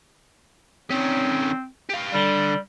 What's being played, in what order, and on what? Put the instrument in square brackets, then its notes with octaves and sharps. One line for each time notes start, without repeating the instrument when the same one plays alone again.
[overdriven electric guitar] D#3 C#4 [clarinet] C4
[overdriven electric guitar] G4 F5
[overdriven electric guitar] D3 [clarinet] G3